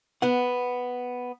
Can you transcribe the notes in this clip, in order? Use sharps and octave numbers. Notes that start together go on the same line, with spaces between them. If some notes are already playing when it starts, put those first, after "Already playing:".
B3 F#5